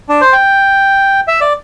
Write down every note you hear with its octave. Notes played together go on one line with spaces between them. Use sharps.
D4
C5
G5
E5
D5